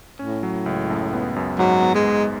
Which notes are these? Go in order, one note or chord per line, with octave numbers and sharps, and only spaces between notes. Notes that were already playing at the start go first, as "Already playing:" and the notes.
A2 C#4
F#3
C#2
F#2
B3
F#2
G#2 F#3
B3
G#3
G#2